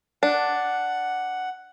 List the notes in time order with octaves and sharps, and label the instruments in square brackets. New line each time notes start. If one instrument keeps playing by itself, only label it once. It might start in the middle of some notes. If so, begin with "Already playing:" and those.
[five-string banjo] D4 [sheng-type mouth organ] F#5